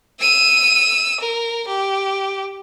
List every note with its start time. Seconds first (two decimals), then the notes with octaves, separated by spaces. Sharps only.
0.21 E6 D#7
1.20 A#4
1.67 G4